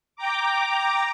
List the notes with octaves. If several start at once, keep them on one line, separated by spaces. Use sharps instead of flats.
G5 A#5 D6